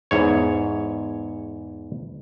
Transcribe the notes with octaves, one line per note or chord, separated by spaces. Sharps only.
E2 G#2 C#5